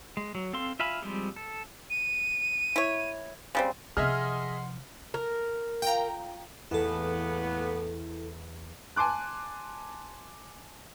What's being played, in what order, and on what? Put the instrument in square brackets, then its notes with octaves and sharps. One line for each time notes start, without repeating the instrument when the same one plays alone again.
[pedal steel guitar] G#3
F#3
C4 A4 F5 C6
F4 E5 F5 G#5 B5
F3 G3 G#3 C4
A4
[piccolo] D#7
[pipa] E4 C#5
C#3 G3 C4
[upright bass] C3 F3 [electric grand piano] G#4 D#5 E5 [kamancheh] F#5 C6 [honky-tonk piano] F6
[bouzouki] A#4
[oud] F4 [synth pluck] G5 A#5
[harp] E2 E5 [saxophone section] A2 A#3 B3 [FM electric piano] E4 A4
[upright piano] G#5 A5 C6 D6 F#6